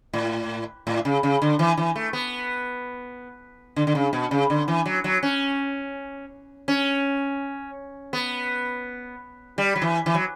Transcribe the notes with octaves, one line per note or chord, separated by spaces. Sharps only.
A2
A2
C#3
C#3
D3
E3
E3
A3
B3
D3
D3
C#3
B2
C#3
D3
E3
F#3
F#3
C#4
C#4
B3
G3
F#3
E3
E3
F#3